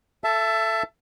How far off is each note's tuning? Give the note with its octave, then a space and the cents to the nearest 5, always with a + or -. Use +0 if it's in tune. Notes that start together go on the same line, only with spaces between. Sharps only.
A4 +0 E5 +25 A5 +0